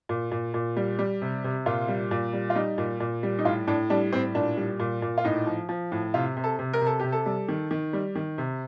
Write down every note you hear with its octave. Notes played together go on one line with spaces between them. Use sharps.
A#2
A#2
A#2
G3
G3
C3
C3
A#2 F4
G3
A#2
G3
F4
G3 D#4
A#2
A#2
G3
D#4
A2 F4
A2 D4
G3 D4
A2 C4
A#2 D4
G3
A#2
A#2
F4
A2 D#4
F3
F3
A2
C3 F4
C3
A4
C3
A#4
C3
A4
C3 G4
A4
G3
D#3
D#3
G3
D#3
C3